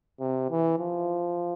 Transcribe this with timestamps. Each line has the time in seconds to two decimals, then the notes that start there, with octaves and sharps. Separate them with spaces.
0.20 C3
0.50 E3
0.79 F3